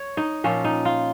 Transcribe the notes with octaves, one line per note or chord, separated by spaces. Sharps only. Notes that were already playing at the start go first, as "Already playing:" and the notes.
Already playing: C#5
D#4
A#2 F3 C#4
D#4
F4